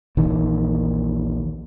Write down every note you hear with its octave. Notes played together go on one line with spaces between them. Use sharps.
A#1 D#2 D#3 E3